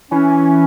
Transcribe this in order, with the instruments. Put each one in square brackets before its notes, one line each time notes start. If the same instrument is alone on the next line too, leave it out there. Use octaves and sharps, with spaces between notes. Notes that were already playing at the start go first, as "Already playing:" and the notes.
[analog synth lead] E3 [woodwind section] C#4